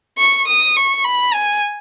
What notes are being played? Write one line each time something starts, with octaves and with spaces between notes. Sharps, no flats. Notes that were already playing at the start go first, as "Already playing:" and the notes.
C#6
D#6
C#6
B5
G#5